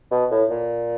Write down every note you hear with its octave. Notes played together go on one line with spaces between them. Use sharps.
B2
A2
A#2